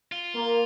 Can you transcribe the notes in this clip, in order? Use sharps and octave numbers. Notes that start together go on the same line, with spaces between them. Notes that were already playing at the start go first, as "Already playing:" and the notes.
F4
A#3